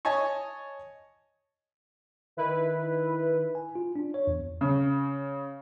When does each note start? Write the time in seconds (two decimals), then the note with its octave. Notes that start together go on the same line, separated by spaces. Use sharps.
0.05 C#5 D#5 G#5 A5 C#6
2.37 D#3 E4 B4
3.55 G#5
3.75 F4
3.96 D4
4.14 C#5
4.27 E2
4.61 C#3